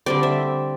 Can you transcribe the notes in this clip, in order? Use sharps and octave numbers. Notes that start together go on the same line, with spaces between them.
D3 G3 C4 D5
E5